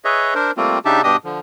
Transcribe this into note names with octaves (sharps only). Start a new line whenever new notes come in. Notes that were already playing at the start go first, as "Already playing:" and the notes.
G#4 B4 C#5 D#5 E5
D4 A#4 C5
G3 A3 A#3 C4 F4
C#3 D4 D#4 G4 E5 A5
G2 B2 D4 G4 D#5 D#6
D3 F3